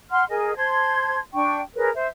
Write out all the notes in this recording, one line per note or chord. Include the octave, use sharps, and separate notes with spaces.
F#5 C6 F6
G#4 A#4 D#5 G#5
C5 A5 C6 G#6
D4 G5 C#6
G#4 A#4 B4 C#5
C5 E5